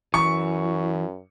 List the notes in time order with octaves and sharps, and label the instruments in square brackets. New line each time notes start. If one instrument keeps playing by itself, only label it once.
[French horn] F#2 [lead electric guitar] E3 [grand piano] C#6